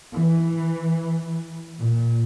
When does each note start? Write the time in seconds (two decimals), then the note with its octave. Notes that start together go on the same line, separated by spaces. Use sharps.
0.11 E3
1.79 A#2